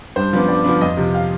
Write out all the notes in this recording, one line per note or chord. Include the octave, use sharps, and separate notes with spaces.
G2 C5
F3 B3 D4
G2 D5
F3 B3 D4
F2 D#5
C3 F3
F5